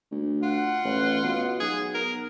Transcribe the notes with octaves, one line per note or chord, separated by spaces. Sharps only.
D2
F4 F#5
A1
B2
B1 G#4
A#4